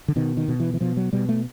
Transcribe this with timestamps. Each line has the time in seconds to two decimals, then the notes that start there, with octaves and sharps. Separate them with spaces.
0.08 D3
0.16 B2 D#3
0.37 D#3
0.48 B2
0.60 E3
0.74 E3
0.81 B2 F3
0.97 F#3
1.13 B2 G3
1.29 A3